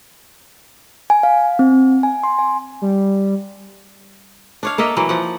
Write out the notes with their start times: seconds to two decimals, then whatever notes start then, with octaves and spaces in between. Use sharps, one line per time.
1.10 G#5
1.23 F5
1.59 C4
2.03 G#5
2.23 C6
2.39 G#5
2.82 G3
4.63 D4 C#5 F5
4.78 A#3 A4 D#5 E5
4.96 E3 F#3 A#3
5.09 F3 F#5